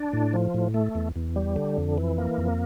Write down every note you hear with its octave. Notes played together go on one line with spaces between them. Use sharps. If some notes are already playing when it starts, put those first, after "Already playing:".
Already playing: D4
A2
F3
A2
A3
E2
E2
G3
D3
F2
E3
A#3
F2